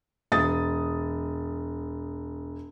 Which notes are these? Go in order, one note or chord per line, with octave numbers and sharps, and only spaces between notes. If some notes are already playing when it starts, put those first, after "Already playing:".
E1 D#6 A6